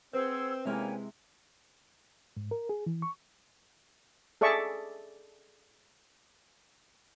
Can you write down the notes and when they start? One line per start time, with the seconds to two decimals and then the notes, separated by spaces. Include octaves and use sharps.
0.13 C4 G#4 B4 C5 F#5 E6
0.65 C3 G#3 A#3 C#4 E4 C#5 G5 G#5
2.37 G#2
2.51 A#4
2.69 G#4
2.86 E3
3.02 C#6
4.41 G#4 A4 D5 E5 C#6